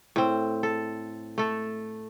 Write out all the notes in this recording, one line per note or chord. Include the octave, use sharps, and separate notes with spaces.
A2 C4
A4
A3 A4